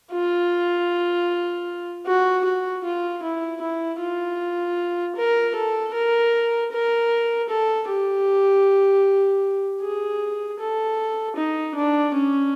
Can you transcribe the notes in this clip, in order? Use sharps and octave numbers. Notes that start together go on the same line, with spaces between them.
F4
F#4
F#4
F4
E4
E4
F4
A#4
A4
A#4
A#4
A4
G4
G#4
A4
D#4
D4
C#4